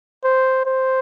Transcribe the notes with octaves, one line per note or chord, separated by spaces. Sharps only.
C5
C5